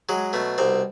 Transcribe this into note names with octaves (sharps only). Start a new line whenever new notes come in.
F#3 G#3
B2 A3
C2 C4